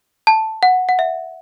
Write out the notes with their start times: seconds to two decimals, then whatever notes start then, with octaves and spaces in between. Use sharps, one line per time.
0.27 A5
0.63 F#5
0.89 F#5
0.99 E5